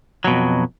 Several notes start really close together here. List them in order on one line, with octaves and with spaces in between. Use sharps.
F#3 B2 F2